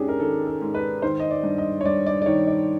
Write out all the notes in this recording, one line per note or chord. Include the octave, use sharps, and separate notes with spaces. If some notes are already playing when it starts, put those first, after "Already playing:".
Already playing: G#2 C#4 D4 G4 G#4
A#4
D#3 A4
A4
G#2
B4
D#3 C5
D#5
D5
G2
D#5
C#5
G2 D5
D5
D5
D#3 C#5
D5